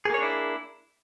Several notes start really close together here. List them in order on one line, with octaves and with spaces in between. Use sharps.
G#4 A#3 C#5 D4 E4